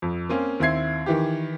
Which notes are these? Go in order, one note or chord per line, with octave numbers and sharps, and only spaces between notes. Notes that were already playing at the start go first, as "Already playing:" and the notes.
F2
A#3 C4 C#4
D#2 C4 E4 G#6 C7
D#3 E3 G4